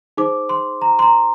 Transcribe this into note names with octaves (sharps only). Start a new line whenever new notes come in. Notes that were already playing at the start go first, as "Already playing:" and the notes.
D#4 G#4 C5 D6
C6
A#5
C6
A#5